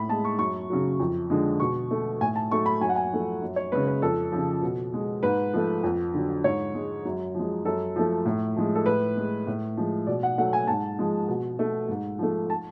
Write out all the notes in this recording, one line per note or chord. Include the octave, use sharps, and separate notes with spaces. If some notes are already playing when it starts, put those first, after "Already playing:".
Already playing: A2 B5
G#3 A5
C#6
F#2 C#6
C#3 F#3
F2
D3 F3 G#3
B2 C#6
A3
A2 G#5
A5
F#3 A3 C#6
B5
F#2 G#5
F#5
G#5
F3 A3
F#2
C#5
C#3 G#3 B4
B4
F2 A4
C#3 F3
B2
G#3
G#2 B4
F3 A3
F2
D3 F#3
G#2 C#5
G#3
F#2
F3 G#3
F#2 A4
F3 A3
A2
F3 G#3
A4
A2 B4
G#3
A2
F3 G#3
B2 D5
F#5
F#3 A3 F#5
G#5
G#2 A5
F3 G#3
B2
A3
G#2
F3 A3
A5